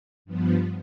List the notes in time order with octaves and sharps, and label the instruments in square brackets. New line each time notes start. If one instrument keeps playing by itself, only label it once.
[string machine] G2 F3 B3